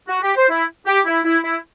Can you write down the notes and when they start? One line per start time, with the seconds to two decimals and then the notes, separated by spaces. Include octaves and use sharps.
0.08 F#4
0.22 G4
0.36 C5
0.50 E4
0.87 G4
1.06 E4
1.24 E4
1.43 E4